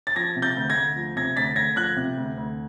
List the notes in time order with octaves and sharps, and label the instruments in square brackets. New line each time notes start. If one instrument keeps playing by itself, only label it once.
[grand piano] A6
F3 G#6 A#6
C3
G6 A6
D2
G#6 A#6
D2
F3
C3 G#6 A#6
D2 A6 B6
D2 G#6 A#6
F3 F#6 G#6
C3
D2
D2